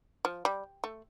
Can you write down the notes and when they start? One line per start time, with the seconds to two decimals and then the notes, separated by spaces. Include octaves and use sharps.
0.25 F3
0.45 G3
0.84 A3